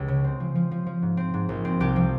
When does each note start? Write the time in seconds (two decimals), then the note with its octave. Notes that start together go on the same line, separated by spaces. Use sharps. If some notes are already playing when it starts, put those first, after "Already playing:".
Already playing: C#2 G4
0.08 C#3
0.24 C4
0.40 F3
0.55 F3
0.71 F3
0.86 F3
1.02 G#2
1.17 C4
1.34 G#2
1.49 A#1
1.65 C4
1.80 C2 G4
1.96 F3